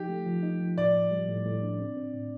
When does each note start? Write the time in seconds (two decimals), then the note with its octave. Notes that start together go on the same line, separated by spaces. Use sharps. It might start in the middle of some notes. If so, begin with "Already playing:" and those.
Already playing: F3 D#4 G4
0.09 A3
0.26 F3
0.43 D#4
0.61 F3
0.78 A2 D5
0.94 A2
1.11 G3
1.29 A2
1.46 A2
1.63 D4
1.79 C4
1.97 C4
2.14 A2